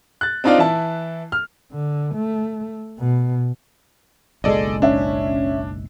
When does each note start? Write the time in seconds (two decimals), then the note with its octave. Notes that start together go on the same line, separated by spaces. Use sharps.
0.21 F#6 A6
0.44 C4 D4 D#4 F4 D5 F5
0.58 E3 E4 A5
1.32 F6
1.72 D3
2.15 A3
2.99 B2
4.44 F#1 B1 G#3 A4 D5 D#5
4.82 C#4 D4 C#5 E5